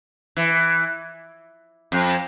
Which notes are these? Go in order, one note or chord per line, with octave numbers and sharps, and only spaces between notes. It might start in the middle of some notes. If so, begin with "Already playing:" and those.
E3
F2